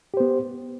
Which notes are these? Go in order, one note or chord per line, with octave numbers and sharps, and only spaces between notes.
B3 G4 C5